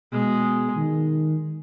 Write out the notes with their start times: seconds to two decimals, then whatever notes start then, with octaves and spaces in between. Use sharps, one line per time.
0.13 B2 G#3
0.77 D#3